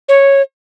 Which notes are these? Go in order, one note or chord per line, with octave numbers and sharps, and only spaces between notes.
C#5